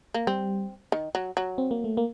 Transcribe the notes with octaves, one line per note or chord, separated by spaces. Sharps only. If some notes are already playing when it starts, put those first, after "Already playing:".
A#3
G3 C4
D#3
F#3
F#3
C4
A#3
A3
A#3